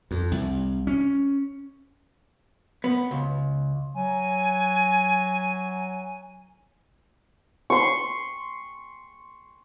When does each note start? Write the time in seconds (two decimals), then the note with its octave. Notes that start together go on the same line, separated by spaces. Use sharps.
0.11 F2
0.32 C2
0.87 C#4
2.84 B3
3.11 C#2
3.95 F#3 G#5
7.70 C6 C#6